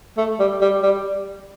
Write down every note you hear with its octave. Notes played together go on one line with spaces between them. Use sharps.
A3
G3
G3
G3